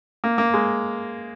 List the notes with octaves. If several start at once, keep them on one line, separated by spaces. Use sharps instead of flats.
A#3
A#3
G#3